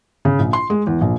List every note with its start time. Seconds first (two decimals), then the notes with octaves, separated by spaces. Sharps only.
0.25 C#3
0.39 A#1
0.53 C6
0.70 G#3
0.87 E2
1.01 A#1